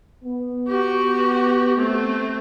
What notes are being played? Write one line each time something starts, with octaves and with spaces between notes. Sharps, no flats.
B3
F#4 G4
A3 C4